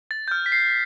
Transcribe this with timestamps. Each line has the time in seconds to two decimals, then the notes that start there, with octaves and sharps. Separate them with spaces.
0.11 A6
0.28 G6
0.31 F6
0.46 B6
0.52 C7